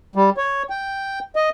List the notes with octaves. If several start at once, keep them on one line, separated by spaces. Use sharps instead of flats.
G3
C#5
G5
D#5